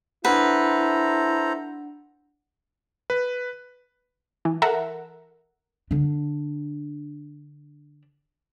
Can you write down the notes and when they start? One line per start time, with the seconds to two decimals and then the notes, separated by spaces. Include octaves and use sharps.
0.25 D4 E4 A4 B4 C5 F#5 A#5
3.10 B4
4.45 E3
4.62 A4 A#4 E5 F#5 A#5
5.91 D3 D4